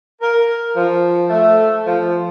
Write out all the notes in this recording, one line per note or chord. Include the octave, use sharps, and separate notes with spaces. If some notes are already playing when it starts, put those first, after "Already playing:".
A#4
F3
A3
F3